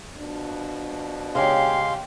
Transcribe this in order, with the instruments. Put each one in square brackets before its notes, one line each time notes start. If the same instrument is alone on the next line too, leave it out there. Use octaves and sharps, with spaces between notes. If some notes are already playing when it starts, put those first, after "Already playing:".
[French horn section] B2 F3 D4
[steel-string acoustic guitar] C#3 G#3 [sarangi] G4 [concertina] F5 C6